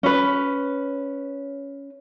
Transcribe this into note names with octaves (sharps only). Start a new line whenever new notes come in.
C#4 B4